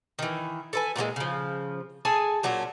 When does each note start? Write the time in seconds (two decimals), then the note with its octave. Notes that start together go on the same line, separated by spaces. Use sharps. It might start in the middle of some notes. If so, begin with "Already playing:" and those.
0.19 D#3 E3
0.73 A4 B4 G#5
0.96 A#2 E3 F3 G#3
1.16 C#3 F3
2.05 G#4 A4 G#5 A5
2.43 A#2 F#3 C#4 D4